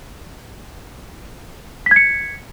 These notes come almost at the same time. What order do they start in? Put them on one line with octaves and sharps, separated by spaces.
B6 G#6 C#7